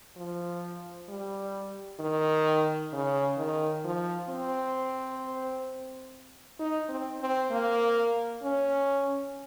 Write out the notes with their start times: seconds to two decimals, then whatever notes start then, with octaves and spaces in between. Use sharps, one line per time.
0.16 F3
1.09 G3
2.00 D#3
2.93 C#3
3.37 D#3
3.84 F3
4.29 C4
6.59 D#4
6.89 C4
7.21 C4
7.51 A#3
8.43 C#4